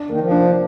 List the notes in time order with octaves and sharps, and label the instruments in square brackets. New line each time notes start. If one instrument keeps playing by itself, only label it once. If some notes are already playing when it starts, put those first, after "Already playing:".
Already playing: [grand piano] D4
[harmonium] D#3 [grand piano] A#3
[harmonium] F3
[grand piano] D4